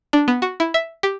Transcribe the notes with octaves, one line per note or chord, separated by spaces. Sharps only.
D4
B3
F#4
E4
E5
G4